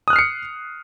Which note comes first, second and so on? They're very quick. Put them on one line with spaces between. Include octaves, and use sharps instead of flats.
D#6 F#6 F6 C7 C#7